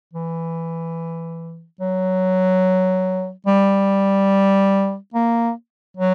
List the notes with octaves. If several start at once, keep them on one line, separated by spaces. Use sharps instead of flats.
E3
F#3
G3
A#3
F#3